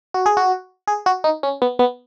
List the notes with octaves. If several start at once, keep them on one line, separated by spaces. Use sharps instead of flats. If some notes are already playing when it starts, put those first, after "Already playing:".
F#4
G#4
F#4
G#4
F#4
D#4
C#4
B3
B3